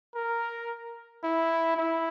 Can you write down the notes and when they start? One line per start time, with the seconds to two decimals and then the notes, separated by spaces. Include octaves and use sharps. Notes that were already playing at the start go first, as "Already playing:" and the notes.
0.15 A#4
1.24 E4
1.77 E4